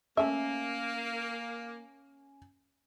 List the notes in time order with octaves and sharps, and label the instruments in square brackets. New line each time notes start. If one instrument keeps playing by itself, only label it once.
[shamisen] A3 E5 [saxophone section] A#3 [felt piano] C#4